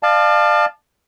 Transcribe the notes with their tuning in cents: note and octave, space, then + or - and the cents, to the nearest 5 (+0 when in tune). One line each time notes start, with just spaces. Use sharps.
D5 +40 F5 +0 A5 -10